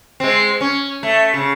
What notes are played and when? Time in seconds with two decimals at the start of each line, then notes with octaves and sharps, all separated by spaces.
0.20 G#3 C4
0.61 C#4
1.03 A3
1.34 C#3